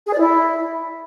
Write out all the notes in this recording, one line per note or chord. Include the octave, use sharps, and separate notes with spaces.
G#4
D5
E4